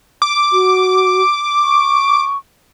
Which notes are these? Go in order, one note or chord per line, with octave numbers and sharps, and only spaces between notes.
D6
F#4
C#6